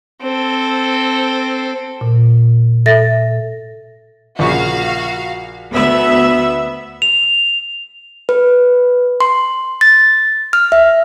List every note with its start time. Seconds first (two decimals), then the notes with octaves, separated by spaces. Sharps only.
0.22 C4 A4
2.01 A#2
2.86 A4 E5 A6 A#6
4.39 A#1 C#3 F#4 F5 C#6
5.72 D2 B3 E5
7.02 F7
8.29 B4
9.21 C6
9.81 A6
10.53 F6
10.72 E5